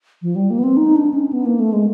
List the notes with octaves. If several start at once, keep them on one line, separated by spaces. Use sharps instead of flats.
F3
G3
A#3
B3
C4
D#4
D4
C#4
B3
A#3
A3
G#3